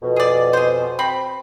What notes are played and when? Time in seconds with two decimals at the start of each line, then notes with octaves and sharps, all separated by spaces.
0.02 F2 B2
0.16 G#4 D5
0.53 G#4 C5
0.99 C4 B5